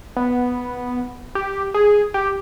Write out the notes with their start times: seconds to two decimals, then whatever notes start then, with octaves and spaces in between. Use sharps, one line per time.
0.16 B3
1.35 G4
1.74 G#4
2.14 G4